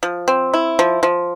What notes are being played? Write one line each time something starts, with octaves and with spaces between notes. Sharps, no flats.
F3
C4
E4
F3
F3